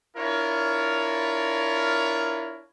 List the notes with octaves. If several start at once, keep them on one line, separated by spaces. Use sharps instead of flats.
D4 E4 F4 A#4 C#5